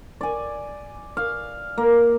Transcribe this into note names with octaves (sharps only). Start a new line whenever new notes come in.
D5 G#5
F5
A#3